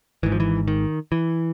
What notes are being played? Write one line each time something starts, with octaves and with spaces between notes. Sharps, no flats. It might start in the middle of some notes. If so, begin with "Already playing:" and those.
G#1 G#2 E3
F3
E3
D#3
E3